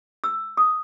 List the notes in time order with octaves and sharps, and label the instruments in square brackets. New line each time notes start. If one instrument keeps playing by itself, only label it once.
[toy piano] E6
D#6